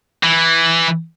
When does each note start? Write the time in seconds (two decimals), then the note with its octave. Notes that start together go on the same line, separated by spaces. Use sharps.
0.23 E3